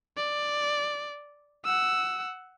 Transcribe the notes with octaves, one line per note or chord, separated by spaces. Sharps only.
D5
F#5 E6